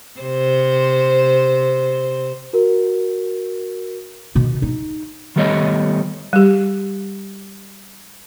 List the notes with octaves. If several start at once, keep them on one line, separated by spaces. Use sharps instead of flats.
C3 C5
F#4 A#4
B2 D#3
D#4
D#3 G3 A3 B3 C#5 D#5
G3 G4